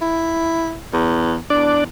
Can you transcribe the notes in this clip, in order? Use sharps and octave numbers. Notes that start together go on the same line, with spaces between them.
E4
E2
E2 D4 D5